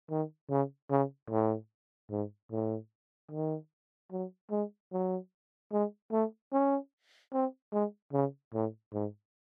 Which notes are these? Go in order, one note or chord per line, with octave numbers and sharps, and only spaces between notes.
D#3
C#3
C#3
A2
G#2
A2
D#3
F#3
G#3
F#3
G#3
A3
C#4
C4
G#3
C#3
A2
G#2